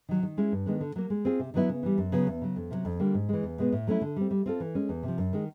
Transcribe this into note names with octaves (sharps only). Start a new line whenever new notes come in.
D#3 F#3
D#3
G#3 C#4 E4
G2
D#3 G#3 B3 D4
D3
F#3 A#3
G#3
C4 F4 G#4
C3
D#3 F#3 B3 E4
C#3
E3 G3
F#2
C#3 F#3 B3
E2
C#3 F#3
F2
C3 D#3 F#3
F2
D3 G3 A#3
G#2
E3 G#3
E2
B2 G#3 B3
A2
F#3 A3 C#4 E4
D3
G3 C4
G3
C4 F4 A4
E3
G#3 C#4
E2
C3
F3
F#2
D#3 G#3